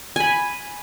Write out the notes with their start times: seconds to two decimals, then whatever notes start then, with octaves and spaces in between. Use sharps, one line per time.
0.16 G#5 B5